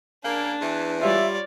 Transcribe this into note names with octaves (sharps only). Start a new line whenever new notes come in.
C#3 A#3 D4
E2 E3
G3 F4 C#5 D5 E5